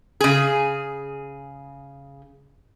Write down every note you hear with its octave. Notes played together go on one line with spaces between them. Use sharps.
C#3 G#4